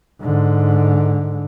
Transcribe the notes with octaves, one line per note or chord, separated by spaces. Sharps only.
G#2 D3